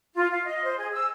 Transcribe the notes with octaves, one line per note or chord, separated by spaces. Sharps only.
F4
F5
D#5
C5
G#4
E6